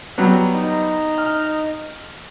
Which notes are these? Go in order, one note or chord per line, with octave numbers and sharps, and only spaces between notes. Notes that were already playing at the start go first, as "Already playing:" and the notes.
F#3 G3 B3
D#4
F6